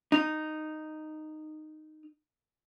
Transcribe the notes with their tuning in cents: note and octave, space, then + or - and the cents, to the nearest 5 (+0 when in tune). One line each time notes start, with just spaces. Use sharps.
D#4 -10